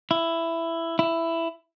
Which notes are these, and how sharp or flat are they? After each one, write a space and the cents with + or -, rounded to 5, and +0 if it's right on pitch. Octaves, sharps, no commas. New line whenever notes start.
E4 +10
E4 +10